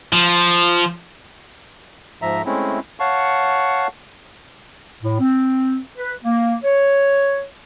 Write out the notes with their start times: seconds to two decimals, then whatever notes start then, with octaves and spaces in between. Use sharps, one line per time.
0.13 F3
2.22 G#2 F3 E5 A#5
2.46 G#3 A3 C4 C#4 E4
3.00 C#5 F5 F#5 A5 C#6
5.03 A2
5.20 C4
5.97 B4
6.24 A#3
6.64 C#5